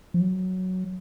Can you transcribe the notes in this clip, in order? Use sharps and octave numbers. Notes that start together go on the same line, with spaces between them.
F3
F#3